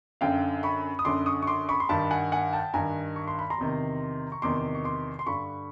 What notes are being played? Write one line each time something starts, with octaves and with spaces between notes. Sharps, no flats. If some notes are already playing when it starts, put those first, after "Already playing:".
F#2 D3 F5 G5
B5 C#6
D#6
F#2 D3 C6 D6
C#6 D#6
C#6
C6 D6
B5 C#6
C6
G2 D#3 A5 B5
F#5 G#5
F#5 G#5
G5 A5
G2 D#3 G#5 A#5
C#6
C6
B5
A#5 C6
E2 C3 D#3
C#6
E2 C3 D#3 C6 D6
C#6
C6 D6
C6
G2 D3 B5 C#6